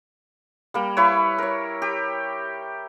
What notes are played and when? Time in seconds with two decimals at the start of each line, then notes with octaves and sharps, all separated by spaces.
0.74 G3 A#3
0.97 E4 B4 C#5
1.38 A#4 C#5
1.82 G4